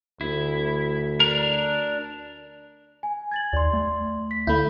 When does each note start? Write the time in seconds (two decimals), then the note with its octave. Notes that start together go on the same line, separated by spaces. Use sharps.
0.21 D2 E4
1.20 D4 A#4
3.03 G#5
3.31 G#6 A6 F#7
3.53 D#2 D5 C6
3.73 A3
4.31 B6
4.47 D2 A3 E4 F5 B5 G6